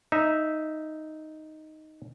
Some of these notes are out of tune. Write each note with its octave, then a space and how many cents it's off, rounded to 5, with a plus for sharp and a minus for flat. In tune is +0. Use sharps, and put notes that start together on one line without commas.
D#4 +0 E5 -10